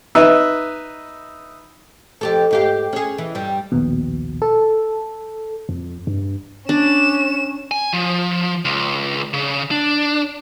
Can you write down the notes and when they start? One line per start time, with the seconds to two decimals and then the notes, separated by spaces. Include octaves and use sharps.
0.15 D#4 B4 E5
2.21 F2 G4 A4
2.51 G#2 G4 F5
2.93 C#4 G#4
3.18 E3
3.35 G2 G3
3.72 A#1 D#2 B2
4.42 A4
5.69 F2
6.07 G2
6.69 C#4 D4 E7
7.71 G#5
7.93 F3
8.65 C#2
9.33 C#3
9.71 D4